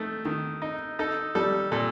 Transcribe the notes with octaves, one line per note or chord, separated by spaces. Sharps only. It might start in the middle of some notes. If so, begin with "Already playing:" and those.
Already playing: D#3 A3
D#3
D#4
D#4 A4
G3 A4
A#2 A4